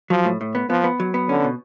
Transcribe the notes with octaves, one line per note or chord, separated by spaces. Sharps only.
F3 F#3
A2
A2
B3
F3 B3
B3
F#3
B3
D3 C#4
B2